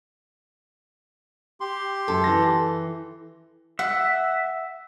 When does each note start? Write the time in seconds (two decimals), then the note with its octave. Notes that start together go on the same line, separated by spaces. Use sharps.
1.60 G4 C6
2.08 F#2 A4
2.24 E3 A#6
3.79 E5 F#5